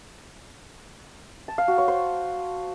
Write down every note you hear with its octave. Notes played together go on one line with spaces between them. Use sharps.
A5
F5
F#4
C#5
C5